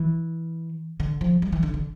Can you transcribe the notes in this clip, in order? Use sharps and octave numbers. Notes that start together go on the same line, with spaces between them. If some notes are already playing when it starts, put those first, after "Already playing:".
Already playing: E3
D3
F3
G3
E3
D3
D3